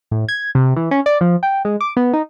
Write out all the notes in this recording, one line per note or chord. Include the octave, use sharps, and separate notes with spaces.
A2
G#6
C3
E3
C#4
D5
F3
G5
G#3
D6
B3
D#4